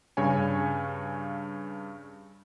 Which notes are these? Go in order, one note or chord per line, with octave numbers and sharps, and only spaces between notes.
G2 C#3 C#5 G#5